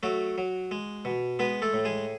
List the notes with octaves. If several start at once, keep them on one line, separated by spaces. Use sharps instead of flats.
F#3 A3 F#4
F#3
G#3
B2
G#3 B3 B4
A3 A4
A2
G#3 G#4